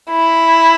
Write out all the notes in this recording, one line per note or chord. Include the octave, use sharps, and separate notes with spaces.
E4